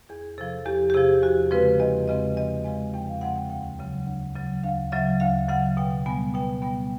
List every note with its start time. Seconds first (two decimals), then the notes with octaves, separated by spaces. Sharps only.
0.09 E2 G#4
0.38 C3 F3 A4
0.66 E2 G4
0.90 G4
0.94 C3 F3 G#4
1.23 E2 F#4
1.51 C#3 F3 G#3 C4 B4
1.80 E2 D#5
2.08 C#3 F3 G#3 C4 D#5
2.37 E2 D#5
2.64 C#3 F3 G#3 C4 G#5
2.93 E2 G5
3.08 F5
3.21 C#3 F3 G#3 C4 F#5
3.36 G5
3.50 D2 G5
3.79 C#3 F#3
4.07 D2
4.36 C#3 F#3
4.63 D2 F5
4.92 C#3 F#3 E5
5.20 D2 F5
5.48 C#3 F#3 F#5
5.77 B2 G5
6.06 G3 B3 G#5
6.34 B2 G5
6.62 G3 B3 G5